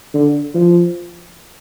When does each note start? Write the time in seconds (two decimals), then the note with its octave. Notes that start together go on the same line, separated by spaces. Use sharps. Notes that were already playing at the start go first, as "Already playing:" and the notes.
0.14 D3
0.55 F3